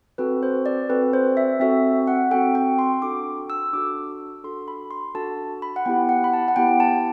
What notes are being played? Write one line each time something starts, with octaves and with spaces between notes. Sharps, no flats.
C4 F#4 A4 B4
C5
D5
C4 F#4 A4 B4
C5
E5
C4 F#4 A4 E5
F#5
C4 F#4 A4 G5
G5
C6
D4 F#4 A4 D6
E6
D4 F#4 A4 D6
D4 F#4 A4 C6
B5
C6
D4 F#4 A4 A5
B5
F#5
B3 E4 G4 G5
F#5
B5
A5
F#5
B3 E4 G4 G5
A5